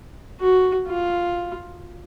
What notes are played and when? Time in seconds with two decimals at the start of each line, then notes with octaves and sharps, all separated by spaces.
0.40 F#4
0.88 F4